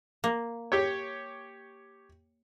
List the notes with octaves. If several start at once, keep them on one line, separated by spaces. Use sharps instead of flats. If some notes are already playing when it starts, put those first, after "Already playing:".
A#3
G4 C#5